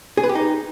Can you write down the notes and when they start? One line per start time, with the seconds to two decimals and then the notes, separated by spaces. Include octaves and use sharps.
0.17 G#4
0.23 B4
0.29 G4
0.35 D#4